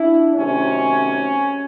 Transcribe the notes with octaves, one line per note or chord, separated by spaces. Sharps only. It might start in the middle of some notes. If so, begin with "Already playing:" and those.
Already playing: D4 E4
C3 D#3 F#3 A3 C#4